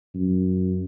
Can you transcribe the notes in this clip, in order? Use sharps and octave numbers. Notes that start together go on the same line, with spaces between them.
F#2